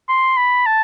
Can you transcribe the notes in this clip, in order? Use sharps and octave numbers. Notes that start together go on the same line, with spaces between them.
C6
B5
A5